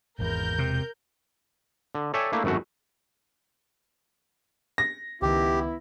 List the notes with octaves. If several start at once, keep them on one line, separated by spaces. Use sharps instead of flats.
G#1 E2 A#4 G6
E1 C3
D3
A4 C#5 D5 E5 G5 G#5
A3 A#3 D4 E4
G#1 F#2 F#3 A3 F#4
A#6
C#2 D#3 B3 E4 G4